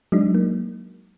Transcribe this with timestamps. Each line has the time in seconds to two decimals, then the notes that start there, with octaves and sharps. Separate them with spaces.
0.12 F#3 G#3 D4 D#4
0.35 A#3